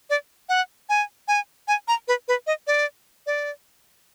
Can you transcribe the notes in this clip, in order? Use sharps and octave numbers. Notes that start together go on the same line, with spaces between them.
D5
F#5
G#5
G#5
G#5
A#5
B4
B4
D#5
D5
D5